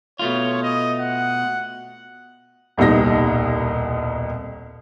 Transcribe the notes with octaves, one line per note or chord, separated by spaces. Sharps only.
B2 A3 F4 C#5
D#5
F#5
D#1 C2 B2 D#4 A#6